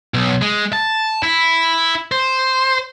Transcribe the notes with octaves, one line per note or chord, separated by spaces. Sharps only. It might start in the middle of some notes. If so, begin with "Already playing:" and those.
B1
G#3
A5
E4
C5